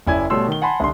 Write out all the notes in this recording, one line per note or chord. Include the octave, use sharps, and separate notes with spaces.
F#1 C#4 E4 D5 G#5 G#6
B2 G3 A3 C#5 C6 E6
D#3 G7
F#5 G#5 A5 B5 C6
C2 D3 C6